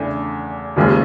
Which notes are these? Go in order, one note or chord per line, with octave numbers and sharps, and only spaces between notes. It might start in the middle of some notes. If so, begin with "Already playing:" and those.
Already playing: E2 C#3 E3 A3 D4
F1 D#2 C#3 F3 G#3